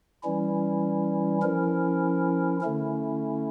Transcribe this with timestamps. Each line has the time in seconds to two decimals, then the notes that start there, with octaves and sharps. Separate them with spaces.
0.24 E3 G3 C#4 E4
1.42 F3 C#4 E4 A#4
2.61 D3 A3 C#4 E4